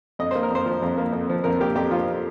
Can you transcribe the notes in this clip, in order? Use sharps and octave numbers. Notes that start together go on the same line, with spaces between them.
F2 D#5
A#3 C5
A#4
F2 C5
F3
F2
A#3
F2
F3
F2 A#4
A#3 G4
F2 G4
F3 F4